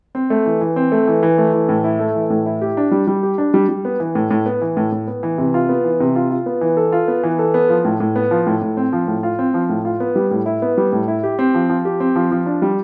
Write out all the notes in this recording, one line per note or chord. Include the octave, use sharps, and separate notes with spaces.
C4
A3
E3
E3
C4
A3
E3
E3
A3
E3
A2
E4
A3
E3
A2
E4
G4
D4
G3
G3
G4
D4
G3
G3
B3
E3
A2
A2
B3
E3
A2
A2
B3
E3
C3
F4
B3
E3
C3
F4
F4
B3
E3
A4
F4
B3
E3
A4
B3
F3
A2
A2
B3
F3
A2
A2
C4
F3
A2
F4
C4
F3
A2
F4
B3
G3
A2
E4
B3
G3
A2
E4
G4
C4
F3
F3
G4
C4
F3
F3
D4
G3